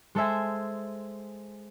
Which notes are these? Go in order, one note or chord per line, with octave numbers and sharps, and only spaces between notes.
G#3 A4 C5 E5 G#5